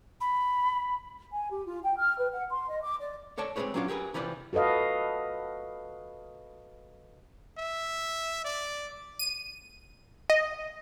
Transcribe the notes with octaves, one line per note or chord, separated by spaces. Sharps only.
B5
G#5
G4
F4
G5
F6
B4
F#5
C6
D#5
D6
D5
A4 C#5 D5 A5
G#3 C4 D#4 G#4 B4 C#5
F#3 B3 C#4 D4 F4
G4 G#4 A#4 B4
C3 E3 F3 B4 D5
F#4 A4 B4 D#5 F5
E5
D5
D#7
D#5